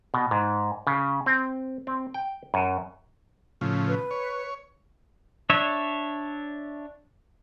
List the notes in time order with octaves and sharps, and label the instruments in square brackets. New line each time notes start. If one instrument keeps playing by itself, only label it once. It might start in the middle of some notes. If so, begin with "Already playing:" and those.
[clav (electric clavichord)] B2
G#2
C#3
C4
C4
G5
F#2
[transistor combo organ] A2 C#3 F3
[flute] B4
[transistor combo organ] C#5
[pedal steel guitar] D4 C#5 E5